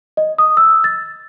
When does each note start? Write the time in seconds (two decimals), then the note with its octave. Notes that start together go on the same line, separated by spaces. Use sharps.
0.17 D#5
0.38 D#6
0.57 E6
0.84 A6